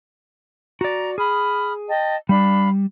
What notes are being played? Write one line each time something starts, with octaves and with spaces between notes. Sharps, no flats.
F#4 D5 A#5
G#4 B5 D#6 F6
D#5 G5 A5
G3 D4 F5 B5